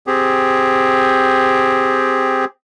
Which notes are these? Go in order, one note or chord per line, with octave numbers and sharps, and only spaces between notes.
C4 G4 G#4